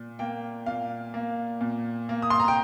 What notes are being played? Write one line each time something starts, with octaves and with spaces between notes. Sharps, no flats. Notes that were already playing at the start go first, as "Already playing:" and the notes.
Already playing: A#2
A#3 G5
A#2 F5
A#3
A#2
A#3
D#6
C6
A#5
G5